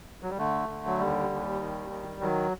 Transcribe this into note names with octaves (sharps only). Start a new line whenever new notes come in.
F#3
G3
D3 A3
D3
F#3
D#2 G3
D#2
D#3
D#3
D#3 F#3